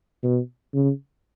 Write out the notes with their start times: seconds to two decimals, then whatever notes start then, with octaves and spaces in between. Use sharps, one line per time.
0.23 B2
0.74 C#3